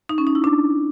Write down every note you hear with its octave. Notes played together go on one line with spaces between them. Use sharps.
D#4
C#4
D#4
E4
D4